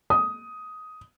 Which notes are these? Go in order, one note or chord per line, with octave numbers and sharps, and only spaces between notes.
D#6